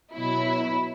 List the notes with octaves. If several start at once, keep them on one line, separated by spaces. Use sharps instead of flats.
B2 F#3 E4